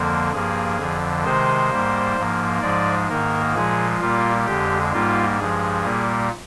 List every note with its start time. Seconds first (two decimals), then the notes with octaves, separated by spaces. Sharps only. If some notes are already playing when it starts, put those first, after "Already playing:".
Already playing: F2 D3 F3 A#3
0.32 G2 F3 A#3 G#4
0.78 F2 D3 F3
1.24 C3 D#3 G#3 C5
1.71 G#2 G3 A#3
2.16 G#2 F3 A#3
2.62 G#2 F3 G#3 D5
3.09 G#2 D#3 A#3 A#4
3.54 A#2 F3 G#3 G#4
4.00 A#2 G3 A#3 F4
4.46 F2 D3 G#3 G4
4.93 G#2 G3 A#3 F4
5.38 G2 F3 G#3 G#4
5.84 A#2 G3 A#3